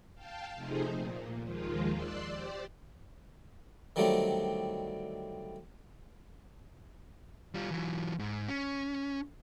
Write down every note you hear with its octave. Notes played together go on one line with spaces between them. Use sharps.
F5 G5 A5
C3 F3 A3 D#4 G#4 C5
A#2
D#2 D#3 F3 G#3 F4
D5 C6 E6 F#6
G4 C5 D5
D3 D#3 F#3 G3 A3 C4
G3 F4
E3 F#3
G#2
C#4